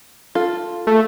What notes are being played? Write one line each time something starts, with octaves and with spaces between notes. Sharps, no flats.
F4 A4
A3